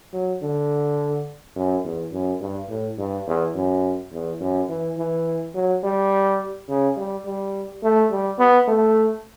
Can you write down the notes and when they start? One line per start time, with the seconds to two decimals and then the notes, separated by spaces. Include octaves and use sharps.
0.13 F#3
0.42 D3
1.56 F#2
1.84 E2
2.13 F#2
2.41 G2
2.70 A2
2.98 G2
3.27 E2
3.55 F#2
4.12 E2
4.40 F#2
4.69 E3
4.97 E3
5.55 F#3
5.83 G3
6.69 C#3
6.97 G3
7.25 G3
7.83 A3
8.11 G3
8.39 B3
8.68 A3